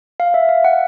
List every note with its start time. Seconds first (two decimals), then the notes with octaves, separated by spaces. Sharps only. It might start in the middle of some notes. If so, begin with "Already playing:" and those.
0.20 F5
0.34 E5
0.49 F5
0.64 F#5